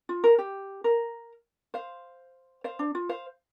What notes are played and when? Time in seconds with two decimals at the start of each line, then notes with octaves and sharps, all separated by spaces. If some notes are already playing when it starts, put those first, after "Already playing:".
0.09 F4
0.24 A#4
0.38 G4
0.84 A#4
1.74 C5 F5
2.64 C5 F5
2.79 D4
2.95 F4
3.09 C5 F5